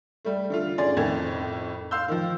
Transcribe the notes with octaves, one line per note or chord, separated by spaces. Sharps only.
G3 A3
D3 A3 F4
C#4 G#4 D5 C6 A6
F2 A2 D#3 G#6
F5 C6 E6 G6
D#3 F3